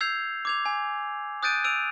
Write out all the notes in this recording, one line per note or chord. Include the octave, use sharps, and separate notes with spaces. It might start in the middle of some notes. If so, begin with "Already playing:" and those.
E6 G6 G#6 C7 F7
D6 G#6 F7
G#5
D#6 F#6 G6 A6 D7 D#7
E6 D7 D#7 F7